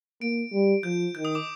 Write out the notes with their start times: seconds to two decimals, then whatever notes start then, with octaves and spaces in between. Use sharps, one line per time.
0.21 A#3 D7
0.53 G3
0.83 F3 G6
1.15 D#3 G6
1.25 D#6
1.35 D6